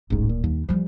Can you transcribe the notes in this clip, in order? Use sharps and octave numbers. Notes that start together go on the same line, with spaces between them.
D1 A1 G#2
A#2
D#2 G3
E3 F3 G3